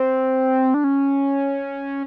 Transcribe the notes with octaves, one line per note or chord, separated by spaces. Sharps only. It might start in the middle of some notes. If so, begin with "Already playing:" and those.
Already playing: C4
D4
C#4